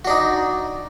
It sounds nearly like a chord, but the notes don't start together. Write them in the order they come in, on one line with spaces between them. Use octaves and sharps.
F#4 D4 D#4